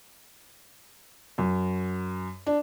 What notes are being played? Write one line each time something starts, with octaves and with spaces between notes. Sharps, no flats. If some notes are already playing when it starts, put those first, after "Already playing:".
F#2
D4